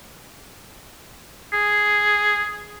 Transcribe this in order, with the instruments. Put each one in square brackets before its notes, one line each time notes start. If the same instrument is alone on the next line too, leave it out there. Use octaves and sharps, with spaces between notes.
[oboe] G#4